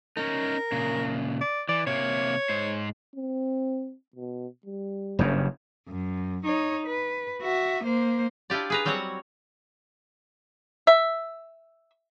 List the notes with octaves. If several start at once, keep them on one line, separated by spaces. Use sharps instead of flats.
C#4 D#4 A#4
A#2 C#3
D5
E3 D5
C3 A#3 C#5
G#2 C5
C4
B2
G3
F#1 G2 C#3
F#2
D#4 C#5
B4
F#4 E5
A#3 C5
D4 E4 F4 G4 D5
G#4 B4 A#5
F#3 G3 C4 F#4 C#5 F#5
E5